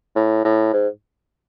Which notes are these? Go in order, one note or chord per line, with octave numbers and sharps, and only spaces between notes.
A2
A2
G#2